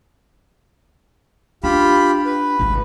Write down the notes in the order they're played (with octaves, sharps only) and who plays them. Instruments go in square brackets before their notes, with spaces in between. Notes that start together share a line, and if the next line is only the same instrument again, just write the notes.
[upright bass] D4 [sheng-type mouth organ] F4 G4 B5
[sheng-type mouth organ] B4
[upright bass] G#1 E4